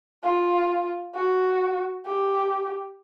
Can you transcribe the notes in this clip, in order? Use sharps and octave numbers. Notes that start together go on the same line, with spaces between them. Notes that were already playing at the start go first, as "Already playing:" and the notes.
F4
F#4
G4